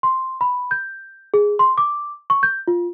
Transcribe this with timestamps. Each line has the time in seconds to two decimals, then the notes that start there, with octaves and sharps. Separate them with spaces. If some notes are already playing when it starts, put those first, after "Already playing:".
0.03 C6
0.41 B5
0.71 G6
1.34 G#4
1.59 C6
1.78 D6
2.30 C#6
2.43 G6
2.68 F4